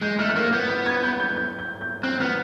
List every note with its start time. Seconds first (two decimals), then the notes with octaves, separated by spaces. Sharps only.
0.02 G#3 G6
0.19 A3 F6
0.29 F#6
0.36 A#3 F6
0.53 B3 G6
0.69 G6
0.86 G#6
1.03 G6
1.20 G6
1.36 G6
1.59 G6
1.81 G6
2.03 C4 F#6
2.20 B3 F6